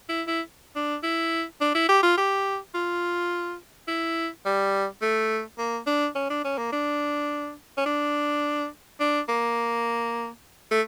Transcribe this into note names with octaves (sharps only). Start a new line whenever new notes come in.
E4
E4
D4
E4
D4
E4
G4
F4
G4
F4
E4
G3
A3
A#3
D4
C#4
D4
C#4
A#3
D4
C#4
D4
D4
A#3
A3